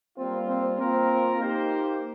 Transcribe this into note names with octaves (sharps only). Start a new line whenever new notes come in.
G3 A#3 C4 F4
C4
A#3 C4 F4 A#4
A#3 D#4 G4 C5